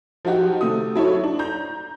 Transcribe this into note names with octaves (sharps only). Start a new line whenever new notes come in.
F3 F#3 D#4 F#4 G4
C3 A3 D#6
F#3 E4 A4 C#5
D4
A#5 G6